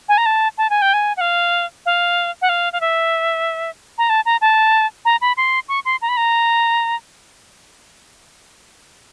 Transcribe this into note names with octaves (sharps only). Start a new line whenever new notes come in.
G#5
A#5
A5
A5
G#5
G5
G#5
F#5
F5
F5
F#5
F5
F5
E5
A#5
A5
A#5
A5
A#5
B5
C6
C#6
C6
A#5
B5
A#5